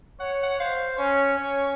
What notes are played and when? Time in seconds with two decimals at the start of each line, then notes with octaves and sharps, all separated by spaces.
0.20 C#5 F#5
0.43 F#5
0.60 C5 F5
0.98 C#4 C#5
1.37 C#4